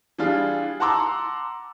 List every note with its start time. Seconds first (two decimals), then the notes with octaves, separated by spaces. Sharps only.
0.18 E3 G3 D4 F4 G#4
0.80 F#5 A5 A#5 C6 D6 E6